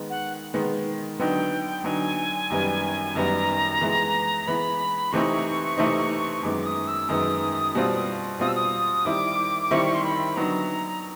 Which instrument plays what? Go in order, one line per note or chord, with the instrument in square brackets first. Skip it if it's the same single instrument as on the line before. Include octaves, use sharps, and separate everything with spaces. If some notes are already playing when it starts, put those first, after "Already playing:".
Already playing: [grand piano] D#3 G#3 B3
[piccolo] F#5
[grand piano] D#3 G#3 B3
[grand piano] D3 F#3 B3 D#4 [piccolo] G5
[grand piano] D3 F#3 B3 D#4 [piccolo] G#5
[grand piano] F#2 D#3 G3 B3
[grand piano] F#2 D#3 G3 B3 [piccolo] A#5
[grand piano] E3 G#3 B3
[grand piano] E3 G#3 B3 [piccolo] B5
[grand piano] C3 E3 A3 C4 D#4 [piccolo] C#6
[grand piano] C3 E3 A3 C4 D#4
[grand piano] F#2 D#3 G#3 B3 [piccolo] D6
[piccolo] D#6
E6
[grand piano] F#2 D#3 G#3 B3 [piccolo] D#6
[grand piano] B2 G3 C4 F4
[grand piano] B2 G3 C4 F4 [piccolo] D#6
[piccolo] E6
D#6
[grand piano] D#3 G3 C4 E4 [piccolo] D6
[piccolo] D6
[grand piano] D#3 G3 C4 E4 [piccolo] C#6
[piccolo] C#6
C6
B5
[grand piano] D3 F#3 B3 D#4 [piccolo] A#5